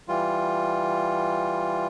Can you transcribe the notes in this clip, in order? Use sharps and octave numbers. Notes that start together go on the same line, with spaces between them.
E3 G3 F4